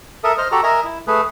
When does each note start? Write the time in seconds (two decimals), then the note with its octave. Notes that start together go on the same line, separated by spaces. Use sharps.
0.24 A4 A#4 E5 D#6
0.38 C5 D#5 F6
0.52 F#4 G4 A4 A#5
0.63 A#4 D#5 E5 G#5 A#5
0.84 E4
1.07 A3 G#4 B4